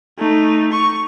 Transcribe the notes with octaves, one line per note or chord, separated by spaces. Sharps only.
A3 D#4
C#6